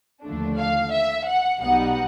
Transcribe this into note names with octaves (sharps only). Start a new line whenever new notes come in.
D#2 D3 F3 A3 D4
F5
E5
F#5
B1 B2 G3 B3 D#4 F#5